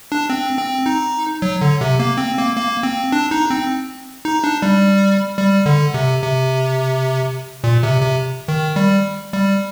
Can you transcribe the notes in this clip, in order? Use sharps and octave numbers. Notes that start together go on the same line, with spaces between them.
D4
C4
C4
D#4
F#3
D3
C3
A#3
C4
A#3
A#3
C4
D4
D#4
C4
D#4
D4
G3
G3
D3
C3
C3
A#2
C3
C3
D#3
G3
G3